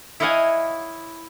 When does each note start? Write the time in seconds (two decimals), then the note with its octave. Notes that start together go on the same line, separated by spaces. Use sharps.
0.20 E4 C#5 D#5 F5 F#5 G#5